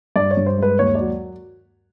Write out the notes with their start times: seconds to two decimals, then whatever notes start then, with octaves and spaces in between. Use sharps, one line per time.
0.16 G2 D5
0.31 C#5
0.37 G2
0.46 C5
0.58 G#3 B4
0.79 D#2 C#5
0.95 F#3 D5